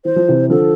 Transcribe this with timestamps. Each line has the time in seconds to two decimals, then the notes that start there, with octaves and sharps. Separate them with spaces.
0.05 E3 C5
0.16 F3
0.28 C3 E3
0.50 D3 F3 A4